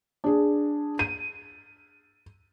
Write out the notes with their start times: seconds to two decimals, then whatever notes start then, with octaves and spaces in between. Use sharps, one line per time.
0.24 D4 G#4
0.99 D#7